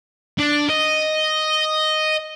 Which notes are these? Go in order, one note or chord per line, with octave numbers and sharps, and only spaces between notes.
D4
D#5